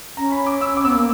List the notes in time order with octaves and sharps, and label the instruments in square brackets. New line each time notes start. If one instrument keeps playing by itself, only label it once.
[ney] C#4 [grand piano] A#5
[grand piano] B5
D6
E6
[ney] C#4 [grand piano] D6
[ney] B3 [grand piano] E6
[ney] A#3 [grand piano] D6